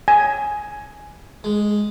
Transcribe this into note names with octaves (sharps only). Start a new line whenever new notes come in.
G#5
G#3